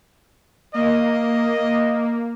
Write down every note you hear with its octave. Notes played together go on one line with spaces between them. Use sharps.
A#3 D#5